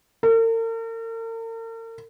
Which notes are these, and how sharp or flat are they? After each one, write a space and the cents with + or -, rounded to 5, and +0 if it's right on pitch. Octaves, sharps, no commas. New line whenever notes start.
A#4 -45